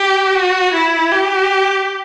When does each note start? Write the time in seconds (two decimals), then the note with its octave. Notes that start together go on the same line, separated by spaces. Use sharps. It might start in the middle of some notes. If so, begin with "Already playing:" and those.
Already playing: G4
0.34 F#4
0.74 E4
1.12 G4